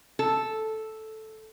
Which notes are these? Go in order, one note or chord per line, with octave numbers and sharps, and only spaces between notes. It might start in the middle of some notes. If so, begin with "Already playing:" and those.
A4